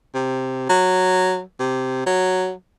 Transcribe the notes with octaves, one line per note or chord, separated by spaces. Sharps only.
C3
F#3
C3
F#3